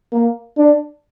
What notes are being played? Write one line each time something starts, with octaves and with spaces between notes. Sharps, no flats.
A#3
D4